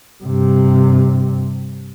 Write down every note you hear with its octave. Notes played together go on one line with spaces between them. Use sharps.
G2 C3